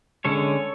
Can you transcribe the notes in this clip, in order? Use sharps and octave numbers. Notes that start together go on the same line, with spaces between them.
D3 G#3 C#4 A4 C#5